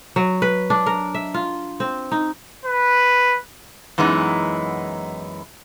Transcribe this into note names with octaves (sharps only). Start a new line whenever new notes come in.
F#3
B4
D4
A#4
E5
F4
C4
D#4
B4
F#2 E3 G#3 B3 D#4